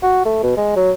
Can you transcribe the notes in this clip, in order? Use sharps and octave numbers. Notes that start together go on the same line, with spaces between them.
F#4
A3
B2
G#3
F#3